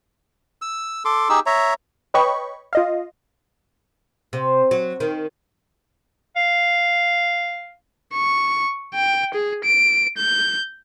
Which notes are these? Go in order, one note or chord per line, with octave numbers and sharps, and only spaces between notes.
E6
A4 C6 D6
D#4 G4 G#4 E6
C#5 E5 A#5
B4 C#5 D#5 G5 B5 C#6
F4 D#5 F5
C3
F#3
D#3
F5
C#6
G5
G#4
D7
G6